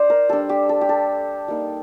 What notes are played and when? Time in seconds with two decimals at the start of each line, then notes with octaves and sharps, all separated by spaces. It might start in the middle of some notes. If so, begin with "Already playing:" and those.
Already playing: D#4 C5 D5
0.10 A#4
0.29 G3 D4 A4
0.49 G4
0.69 A4
0.81 G4
0.89 A4
1.48 G3 A#3 D#4